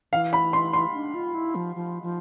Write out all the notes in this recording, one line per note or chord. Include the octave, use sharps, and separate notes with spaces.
E3 F5
B5
C6
C6
D4
F4
E4
F3
F3
F3